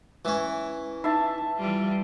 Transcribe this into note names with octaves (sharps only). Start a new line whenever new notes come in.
E3 C#4
D#4 E5 A5
E3 G3 F4